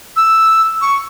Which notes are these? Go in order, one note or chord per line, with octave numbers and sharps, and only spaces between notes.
E6
C#6